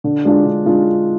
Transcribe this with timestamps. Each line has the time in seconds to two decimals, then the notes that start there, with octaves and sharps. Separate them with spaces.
0.04 D3
0.25 G#3 D4 F4
0.46 D3
0.66 G#3 D4 F4